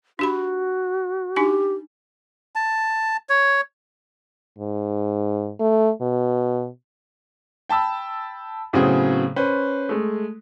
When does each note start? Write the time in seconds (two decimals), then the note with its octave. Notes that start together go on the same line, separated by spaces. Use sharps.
0.19 D4 F#4 G4 B5
1.36 D4 D#4 G4 G#5
2.55 A5
3.29 C#5
4.59 G#2
5.60 A3
6.01 B2
7.69 G5 A5 B5 E6
8.73 A2 C#3 F#3 B3 C4 G#4
9.36 C#4 B4 C5
9.89 G#3 A3